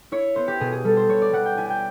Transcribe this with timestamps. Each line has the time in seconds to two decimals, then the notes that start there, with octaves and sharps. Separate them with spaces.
0.12 E4 C#5
0.36 B3 C5
0.48 G4
0.60 B2 G#4
0.72 G#4
0.84 G3 A4
0.97 C5
1.09 B3 C#5
1.22 D5
1.33 G3 F#5
1.46 G5
1.57 E4 G#5
1.70 G5